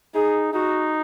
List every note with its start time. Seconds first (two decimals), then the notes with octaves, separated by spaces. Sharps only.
0.14 D#4 G#4
0.53 D#4 F#4